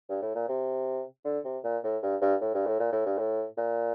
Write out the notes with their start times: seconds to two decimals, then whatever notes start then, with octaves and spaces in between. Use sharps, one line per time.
0.09 G2
0.22 A2
0.35 A#2
0.49 C3
1.25 D3
1.45 C3
1.64 A#2
1.84 A2
2.02 G2
2.21 G2
2.41 A2
2.54 G2
2.66 A2
2.80 A#2
2.92 A2
3.06 G2
3.18 A2
3.57 A#2